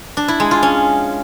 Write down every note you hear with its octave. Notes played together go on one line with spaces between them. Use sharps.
D4
E4
G#3
F4
C#4